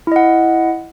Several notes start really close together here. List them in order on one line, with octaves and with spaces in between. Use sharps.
E4 D#5 F#5